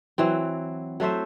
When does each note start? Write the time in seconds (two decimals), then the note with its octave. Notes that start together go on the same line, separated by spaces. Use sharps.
0.18 E3 F#3 C4
1.00 F#3 A3 C5 E5